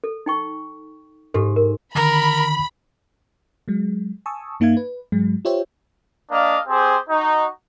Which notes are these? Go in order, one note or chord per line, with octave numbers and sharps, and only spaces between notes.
A4
D#4 G5 C#6
G#2 G4 A4
A#4
D3 D#3 A#4 B5
F#3 G#3
G#5 A5 C#6 D#6 E6
G2 A#3 D#4 E5 F5 G#6
B4
G#2 F#3 G#3
F4 G4 C5 C#5 E5 G5
A#3 D4 D#5 F5
C4 G4 G#4 C5
D#4 F#4